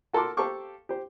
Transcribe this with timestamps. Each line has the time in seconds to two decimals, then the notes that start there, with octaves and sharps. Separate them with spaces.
0.13 F#4 A4 A#4 A5 C6 D6
0.37 G4 A4 C5 F5 C#6 D6
0.89 G4 C5